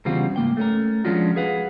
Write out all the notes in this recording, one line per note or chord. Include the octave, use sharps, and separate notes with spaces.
E2 C#3 G3 C4 F4 F#4
G#2 A#3 G5
A3 C#4 A#4
F3 G#3 C#4 D4 F4 F#4
G#4 B4 F5 F#5